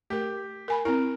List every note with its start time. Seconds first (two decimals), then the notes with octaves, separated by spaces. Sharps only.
0.10 A3 G4 A#4
0.68 A#4 G#5 B5
0.85 C4 E4 A#4